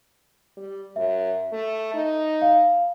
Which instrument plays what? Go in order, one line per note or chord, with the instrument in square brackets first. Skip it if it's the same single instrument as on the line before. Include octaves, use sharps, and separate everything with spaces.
[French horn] G3
[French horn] F#2 [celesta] E5
[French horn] A3
D#4
[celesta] F5